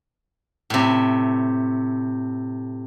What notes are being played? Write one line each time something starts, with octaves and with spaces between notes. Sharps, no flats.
A2 C3